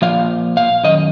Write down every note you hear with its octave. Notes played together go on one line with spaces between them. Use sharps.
A#2 F3 F5
F5
F#2 D#3 D#5